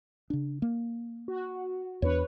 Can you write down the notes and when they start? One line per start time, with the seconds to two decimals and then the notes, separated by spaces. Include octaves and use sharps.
0.30 C#3 D4
0.62 A#3
1.28 F#4
2.02 E2 D4 B4 C#5